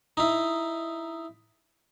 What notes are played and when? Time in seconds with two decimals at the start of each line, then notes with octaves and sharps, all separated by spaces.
0.17 D#4 E4